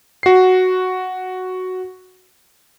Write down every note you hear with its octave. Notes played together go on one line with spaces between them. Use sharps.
F#4 C7